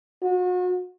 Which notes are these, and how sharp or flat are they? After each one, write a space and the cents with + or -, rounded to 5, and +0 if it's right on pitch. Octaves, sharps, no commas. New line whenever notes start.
F#4 -35